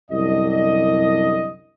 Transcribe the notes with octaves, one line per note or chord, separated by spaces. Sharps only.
C2 F#2 D3 G3 D#5